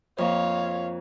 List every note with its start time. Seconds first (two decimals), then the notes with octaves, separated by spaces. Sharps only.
0.18 F2 A#3 C#5 F5